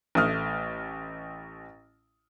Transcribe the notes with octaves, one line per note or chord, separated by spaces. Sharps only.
A1 A3 D#6 F6